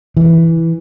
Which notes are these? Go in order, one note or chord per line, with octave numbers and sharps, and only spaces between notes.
E3